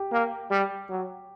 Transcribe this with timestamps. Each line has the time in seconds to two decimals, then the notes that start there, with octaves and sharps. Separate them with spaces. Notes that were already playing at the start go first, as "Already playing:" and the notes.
Already playing: G4
0.12 A#3
0.51 G3
0.90 F#3